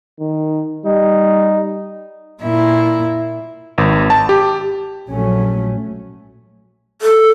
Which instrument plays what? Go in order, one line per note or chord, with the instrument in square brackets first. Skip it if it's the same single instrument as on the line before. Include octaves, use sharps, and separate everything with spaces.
[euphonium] D#3
[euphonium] G3 [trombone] D#4
[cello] A#2 E4
[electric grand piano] G#1
A5
G4
[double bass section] A#1 F#3 A3 C#4
[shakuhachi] A4